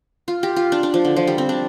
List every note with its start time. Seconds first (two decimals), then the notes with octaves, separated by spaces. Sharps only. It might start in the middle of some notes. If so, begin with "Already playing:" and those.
0.28 F4
0.43 G4
0.56 F4
0.72 D4
0.83 D4
0.94 F3
1.05 D3
1.16 F3
1.27 G3
1.38 C4
1.49 D4